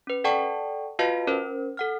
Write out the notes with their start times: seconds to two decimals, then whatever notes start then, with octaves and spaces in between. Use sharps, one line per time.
0.07 C#4 B4
0.24 A4 D5 F#5 G5 A5 C#6
0.99 F4 F#4 B4 D#5 F5 A5
1.27 C#4 A#4 C5
1.77 A4 F#5 F6